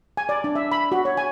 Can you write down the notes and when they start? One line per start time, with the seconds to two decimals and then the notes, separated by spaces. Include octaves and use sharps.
0.17 G#5
0.29 D5
0.44 D4
0.55 E5
0.72 B5
0.92 F#4
1.05 C#5
1.17 G#5